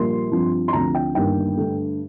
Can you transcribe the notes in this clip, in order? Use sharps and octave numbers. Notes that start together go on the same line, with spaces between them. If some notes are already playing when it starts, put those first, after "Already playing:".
Already playing: A#1 A#2 G3 A#3 C6
G2 F3 C4
C6
D2 D3 F3 C4 A#5
G5
G1 G2 D#3 A#3 G5
G2 D3 A3